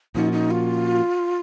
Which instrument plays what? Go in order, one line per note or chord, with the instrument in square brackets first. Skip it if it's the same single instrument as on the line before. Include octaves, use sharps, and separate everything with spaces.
[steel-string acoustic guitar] A#2 F3 A#3 C#4 F#4 [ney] D#4
[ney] D#4
F4